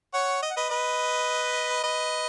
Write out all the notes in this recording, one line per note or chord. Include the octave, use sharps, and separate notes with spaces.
C#5 F#5
D#5
F#5
B4 D#5
B4 D#5
B4 D#5